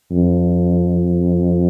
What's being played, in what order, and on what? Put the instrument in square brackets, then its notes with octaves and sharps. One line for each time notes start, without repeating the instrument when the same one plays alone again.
[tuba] F2